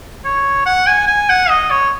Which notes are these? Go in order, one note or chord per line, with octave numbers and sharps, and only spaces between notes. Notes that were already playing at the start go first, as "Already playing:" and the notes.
C#5
F#5
G#5
G#5
F#5
D#5
C#5